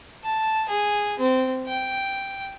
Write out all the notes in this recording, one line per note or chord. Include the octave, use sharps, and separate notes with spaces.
A5
G#4
C4
G5